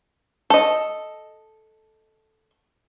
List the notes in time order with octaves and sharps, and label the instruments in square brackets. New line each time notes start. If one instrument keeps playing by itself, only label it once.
[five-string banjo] A4 D#5